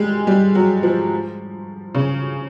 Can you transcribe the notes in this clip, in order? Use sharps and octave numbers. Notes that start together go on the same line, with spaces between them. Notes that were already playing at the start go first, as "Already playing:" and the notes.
Already playing: G3 G#3
G3
F#3
F3
C#3